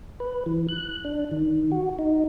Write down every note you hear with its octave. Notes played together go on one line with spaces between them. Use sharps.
B4
E3
F#6
D4
D#3
F#4
D#4